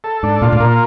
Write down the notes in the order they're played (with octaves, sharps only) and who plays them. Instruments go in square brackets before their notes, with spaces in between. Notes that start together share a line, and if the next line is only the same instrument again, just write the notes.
[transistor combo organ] A4
[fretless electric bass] G#2 [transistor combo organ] D4
[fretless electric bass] A#2 [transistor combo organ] F4
[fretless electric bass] A2
[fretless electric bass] A#2 [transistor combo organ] A#3